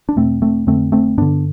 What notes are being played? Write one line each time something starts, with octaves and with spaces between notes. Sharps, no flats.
D4
E2 B2 A3 C4
A3 C4
F2 D3 A3 C4
A3 C4
G2 D3 B3 D4